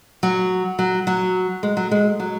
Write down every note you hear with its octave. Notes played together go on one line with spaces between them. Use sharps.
F#3
F#3
F#3
G#3
F#3
G#3
F#3